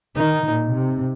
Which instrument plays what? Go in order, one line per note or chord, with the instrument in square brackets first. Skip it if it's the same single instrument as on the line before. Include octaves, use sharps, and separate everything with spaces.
[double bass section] D#3 [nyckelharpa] D#4
[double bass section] A#2
C3